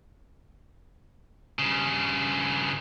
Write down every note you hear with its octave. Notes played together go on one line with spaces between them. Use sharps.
G2 C#3